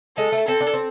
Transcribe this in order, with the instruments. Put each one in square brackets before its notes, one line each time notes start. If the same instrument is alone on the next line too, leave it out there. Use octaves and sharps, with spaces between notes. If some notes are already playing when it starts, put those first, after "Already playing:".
[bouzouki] G#3 [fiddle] A4
[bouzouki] A3
[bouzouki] C4 [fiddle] A4
[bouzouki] D4
C4